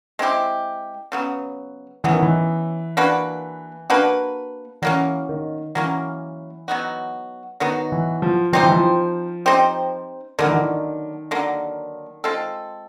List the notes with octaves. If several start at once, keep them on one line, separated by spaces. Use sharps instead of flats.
G#3 C4 E4 G4
C#3 F#3 B3
C#3 E3 F#3 B3
D#3
E3
A#3 D4 F#4 B4
A#3 D4 F#4 B4
E3 F#3 A#3 C#4
D#3
E3 F#3 A#3 C#4
F#3 B3 D#4 F#4
D#3 F#3 B3 D#4 F#4
E3
F3
F3 C4 D#4 G4 C5
E3
F3
C4 D#4 G4 C5
D3 D#3 F#3 A#3
E3
D#3
D3 F#3 A#3
G#3 C4 F4 A4